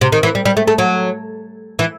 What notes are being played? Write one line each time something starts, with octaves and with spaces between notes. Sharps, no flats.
C3
D#3
E3
G3
G3
A3
A3
F#3
E3